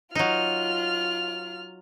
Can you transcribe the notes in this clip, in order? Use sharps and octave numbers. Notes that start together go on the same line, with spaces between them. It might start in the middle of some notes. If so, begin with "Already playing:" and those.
F#3 D#4 F4 F6